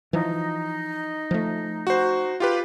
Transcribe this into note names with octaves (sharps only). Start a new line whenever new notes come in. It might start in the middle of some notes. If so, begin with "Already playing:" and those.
E3 F3 D#4
F3 A3
F#4 C5
F4 G4 B4